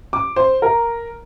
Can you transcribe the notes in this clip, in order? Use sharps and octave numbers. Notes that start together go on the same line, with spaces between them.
D6
C5
A#4